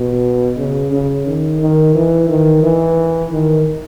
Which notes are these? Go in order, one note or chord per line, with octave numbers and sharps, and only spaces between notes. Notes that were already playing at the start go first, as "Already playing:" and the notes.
Already playing: B2
C#3
C#3
D#3
D#3
E3
D#3
E3
D#3